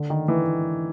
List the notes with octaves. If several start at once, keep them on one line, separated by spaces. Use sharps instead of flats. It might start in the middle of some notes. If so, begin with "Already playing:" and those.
Already playing: D3
D#3
E3